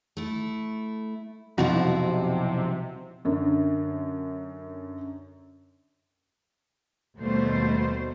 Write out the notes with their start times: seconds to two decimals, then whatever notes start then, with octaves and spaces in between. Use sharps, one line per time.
0.17 A3 E4
1.58 B1 F2 C3 F3 C4 E4 F#4
3.25 F#2 D3
7.18 D#2 B2 G3 A3 C5